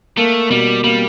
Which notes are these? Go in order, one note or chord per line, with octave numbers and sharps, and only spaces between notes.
A3 A#3
B2 G3
G3 A#3